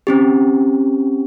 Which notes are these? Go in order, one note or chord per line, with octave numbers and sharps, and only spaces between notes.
C4 C#4 G4